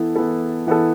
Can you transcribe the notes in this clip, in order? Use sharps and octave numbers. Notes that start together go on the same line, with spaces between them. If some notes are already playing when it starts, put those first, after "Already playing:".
Already playing: E3 B3 E4 A4
E3 B3 E4 A4
E3 B3 E4 A4